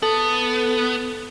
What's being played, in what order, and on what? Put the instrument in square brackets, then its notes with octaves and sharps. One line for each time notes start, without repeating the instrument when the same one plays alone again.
[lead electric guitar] B3 [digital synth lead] A4